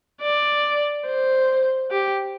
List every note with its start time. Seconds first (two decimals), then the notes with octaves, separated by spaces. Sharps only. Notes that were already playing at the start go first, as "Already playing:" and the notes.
0.22 D5
1.06 C5
1.91 G4